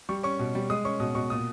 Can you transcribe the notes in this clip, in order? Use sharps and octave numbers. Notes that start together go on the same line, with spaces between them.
G3 C#6
C#4 C#6
B2
G3
G#3 D#6
C#4 C#6
B2 D#6
B2 C#6
A#2 D#6